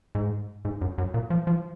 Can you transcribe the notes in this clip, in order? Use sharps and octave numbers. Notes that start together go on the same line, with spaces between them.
G#2
G#2
F#2
F#2
A#2
F3
F3